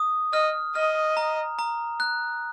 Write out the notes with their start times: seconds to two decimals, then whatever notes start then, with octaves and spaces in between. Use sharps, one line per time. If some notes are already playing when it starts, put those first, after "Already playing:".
Already playing: D#6
0.33 D#5 F6
0.75 D#5 F6
1.17 A#5
1.59 A#5
2.00 F#6